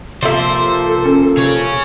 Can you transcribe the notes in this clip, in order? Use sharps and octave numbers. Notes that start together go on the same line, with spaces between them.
C3 F3 A#3 A4 C5 E5
C#4
C3 G#4 C#5